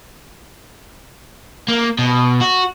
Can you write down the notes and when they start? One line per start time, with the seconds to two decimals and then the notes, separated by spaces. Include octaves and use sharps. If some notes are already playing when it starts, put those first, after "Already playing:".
1.68 A#3
1.99 B2
2.41 F#4